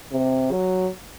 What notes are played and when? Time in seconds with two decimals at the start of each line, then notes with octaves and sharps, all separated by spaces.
0.12 C3
0.52 F#3